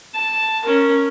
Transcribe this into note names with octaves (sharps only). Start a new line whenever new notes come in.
A5
C#4 A#4